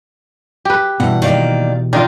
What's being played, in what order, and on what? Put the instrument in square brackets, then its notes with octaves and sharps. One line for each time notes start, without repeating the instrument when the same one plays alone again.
[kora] G4 B4
[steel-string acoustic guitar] G2 F#5 [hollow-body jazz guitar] B2 E3
[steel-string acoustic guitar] D#3 A#3 D5
[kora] D#3 D#4 F4 [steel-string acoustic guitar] D4